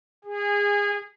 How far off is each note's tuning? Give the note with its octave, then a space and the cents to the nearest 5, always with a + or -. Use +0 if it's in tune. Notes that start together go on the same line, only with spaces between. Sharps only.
G#4 -25